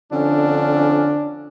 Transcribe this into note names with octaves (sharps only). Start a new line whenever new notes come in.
F2 D3 C#4 D4